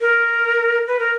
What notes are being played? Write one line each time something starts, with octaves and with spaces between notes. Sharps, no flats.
A#4
B4
A#4